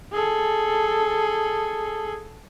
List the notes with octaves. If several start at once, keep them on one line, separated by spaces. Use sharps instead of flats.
G#4 A4